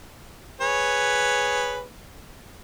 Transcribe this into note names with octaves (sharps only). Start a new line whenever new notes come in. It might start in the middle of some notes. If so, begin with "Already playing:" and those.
G#4 B4 C#5